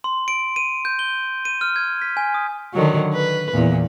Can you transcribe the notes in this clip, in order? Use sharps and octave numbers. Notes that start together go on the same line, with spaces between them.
C6
D7
D#7
G6
G7
D#7
F6
G#6
B6
G#5
D#6
D3 D#3 F#3
B4
E2 A#2